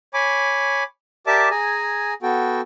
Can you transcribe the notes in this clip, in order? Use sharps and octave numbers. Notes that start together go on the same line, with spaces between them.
C#5 G#5 B5 D6
G4 A#4 D5 E5 A5 D6
G#4 G#5 A#5
B3 F#4 A4 G5